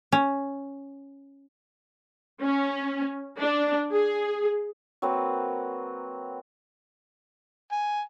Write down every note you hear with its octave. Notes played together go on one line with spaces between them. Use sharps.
C#4
C#4
D4
G#4
F#3 A#3 C4 B4
G#5